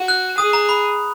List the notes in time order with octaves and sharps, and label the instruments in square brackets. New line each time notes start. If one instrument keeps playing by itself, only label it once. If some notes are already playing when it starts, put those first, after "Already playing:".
Already playing: [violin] F#4
[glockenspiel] F#6
[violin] G#4 [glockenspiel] D#6
[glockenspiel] A#5
B5